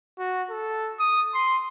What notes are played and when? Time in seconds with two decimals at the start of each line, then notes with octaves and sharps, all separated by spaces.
0.18 F#4
0.50 A4
0.99 D#6
1.34 C6